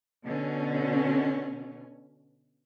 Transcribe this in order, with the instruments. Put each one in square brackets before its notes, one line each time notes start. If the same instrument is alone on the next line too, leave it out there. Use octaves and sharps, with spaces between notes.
[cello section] B2 D3 C#4